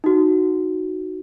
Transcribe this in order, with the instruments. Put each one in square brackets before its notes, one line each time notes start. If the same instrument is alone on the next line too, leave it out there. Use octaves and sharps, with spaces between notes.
[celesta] D#4 F#4